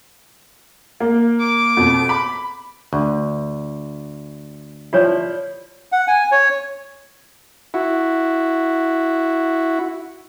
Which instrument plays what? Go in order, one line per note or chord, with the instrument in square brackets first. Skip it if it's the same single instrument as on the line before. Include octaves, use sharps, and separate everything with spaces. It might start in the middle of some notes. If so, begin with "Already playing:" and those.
[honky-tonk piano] A#3
[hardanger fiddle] D6
[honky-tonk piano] F2 B2
B5
[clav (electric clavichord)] D2
[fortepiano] F3 E4 [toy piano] G4 C#5 D5
[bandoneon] F#5
G#5
C#5
[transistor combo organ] E4 F#4